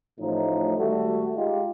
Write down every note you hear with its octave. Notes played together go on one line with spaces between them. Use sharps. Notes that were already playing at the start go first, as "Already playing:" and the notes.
A1 A2 F3 D#4
G#1 G3 A3 F#4 A4
G#3 D#4 F4 G4